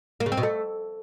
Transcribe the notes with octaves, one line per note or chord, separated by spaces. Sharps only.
A#3
C#3
C4
B2
A3